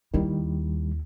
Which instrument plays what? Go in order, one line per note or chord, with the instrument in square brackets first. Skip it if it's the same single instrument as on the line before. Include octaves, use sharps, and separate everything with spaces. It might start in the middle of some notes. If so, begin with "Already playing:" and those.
[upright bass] D#2 E4 [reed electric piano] D#3 G3